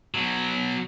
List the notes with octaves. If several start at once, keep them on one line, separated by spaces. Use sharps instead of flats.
B2 F#3